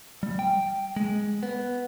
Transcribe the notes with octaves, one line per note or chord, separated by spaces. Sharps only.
G3
G5
G#3
B3